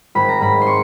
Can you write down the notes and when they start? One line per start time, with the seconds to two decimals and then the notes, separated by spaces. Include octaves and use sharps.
0.15 G#1 B5
0.29 A#5
0.41 G#2 B5
0.61 C6
0.67 C#6